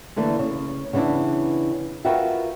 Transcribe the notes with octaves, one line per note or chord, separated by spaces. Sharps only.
D3 E3 A3 A#3
C#3
C#3 E3 B3 D4 E4
F4 F#4 A#4 B4 E5 G5